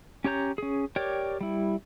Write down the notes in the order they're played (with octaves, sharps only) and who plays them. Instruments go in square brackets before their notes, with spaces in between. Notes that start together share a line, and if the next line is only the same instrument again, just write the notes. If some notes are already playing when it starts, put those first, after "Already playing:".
[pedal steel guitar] C#4 G4 C#5 A#5 G6
C#4 G#4
G4 A#4 C#5 D5 G5
G3 E4